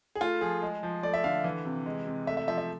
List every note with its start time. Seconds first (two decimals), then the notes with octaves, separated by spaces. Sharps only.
0.15 G#4
0.21 A3 F4
0.41 F3 G#4
0.62 G#3
0.83 F3
1.03 A3 D5
1.14 E5
1.24 D3 F5
1.44 E3
1.65 C3
1.86 G#3
2.07 C3
2.27 A3 E5
2.37 E5
2.47 F3 E5
2.58 E5